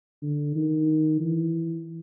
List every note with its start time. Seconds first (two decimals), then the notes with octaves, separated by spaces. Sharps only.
0.22 D3
0.56 D#3
1.20 E3